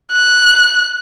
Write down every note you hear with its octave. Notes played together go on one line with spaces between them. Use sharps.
F#6